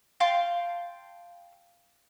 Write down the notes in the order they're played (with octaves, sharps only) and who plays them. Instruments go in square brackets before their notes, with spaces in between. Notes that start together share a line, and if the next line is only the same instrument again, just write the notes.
[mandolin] F5 G5 A5 C6